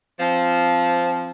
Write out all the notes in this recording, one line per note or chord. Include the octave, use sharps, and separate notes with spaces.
F3 C4